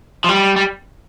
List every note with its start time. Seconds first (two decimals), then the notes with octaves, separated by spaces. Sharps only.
0.24 F3
0.29 G3
0.56 G3